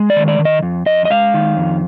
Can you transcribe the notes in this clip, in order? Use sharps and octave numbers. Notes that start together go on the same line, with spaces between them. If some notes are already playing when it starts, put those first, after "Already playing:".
Already playing: G#3
D5
D#3
D5
D#3
D#5
F2
F2 D#5
D#5
G#3 F5
D#3
F2